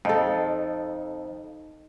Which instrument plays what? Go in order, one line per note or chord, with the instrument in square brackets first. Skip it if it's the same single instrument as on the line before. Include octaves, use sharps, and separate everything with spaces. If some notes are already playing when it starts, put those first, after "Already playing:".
[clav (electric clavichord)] F2 [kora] D#4 A4